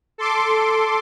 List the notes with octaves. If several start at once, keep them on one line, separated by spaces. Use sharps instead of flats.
A4 C6 D6